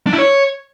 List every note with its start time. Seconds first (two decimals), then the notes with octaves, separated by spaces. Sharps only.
0.07 D4
0.13 E4
0.18 C#5